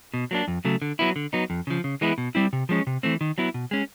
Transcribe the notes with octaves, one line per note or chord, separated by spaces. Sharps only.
B2
F#3 A#3 D4
F2
C#3 F#3 A3
D3
F#3 B3 E4
D3
F#3 B3 D#4
F2
C#3 F3
C#3
E3 G#3 B3 E4
B2
G3 C4 E4
C3
F3 G#3 C#4
C3
E3 A3 C4
D#3
F#3 B3 E4
B2
G#3 C#4